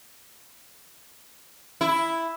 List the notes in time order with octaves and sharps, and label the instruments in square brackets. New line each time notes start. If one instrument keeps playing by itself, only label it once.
[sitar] E4